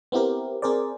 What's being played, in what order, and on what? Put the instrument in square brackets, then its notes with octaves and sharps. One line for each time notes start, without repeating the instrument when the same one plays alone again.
[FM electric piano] B3 C4 E4 G4 A#4
C4 G#4 A#4 C5 D5